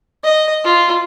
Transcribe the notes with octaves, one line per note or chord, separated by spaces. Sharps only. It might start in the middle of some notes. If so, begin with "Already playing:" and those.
D#5
F4